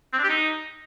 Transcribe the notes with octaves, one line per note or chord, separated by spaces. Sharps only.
C4
D4
G4
D#4